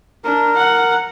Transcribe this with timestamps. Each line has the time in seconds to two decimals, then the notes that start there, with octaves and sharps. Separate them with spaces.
0.24 D4 A#4
0.57 F#5